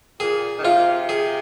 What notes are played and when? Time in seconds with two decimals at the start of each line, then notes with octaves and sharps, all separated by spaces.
0.20 A#2 G#4
0.59 D#3
0.64 C3 F4
1.09 G#4